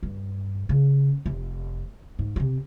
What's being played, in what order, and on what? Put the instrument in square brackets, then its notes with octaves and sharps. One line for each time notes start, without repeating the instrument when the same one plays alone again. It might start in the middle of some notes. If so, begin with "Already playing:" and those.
[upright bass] G2
C#3
F1
G#2
C3 C4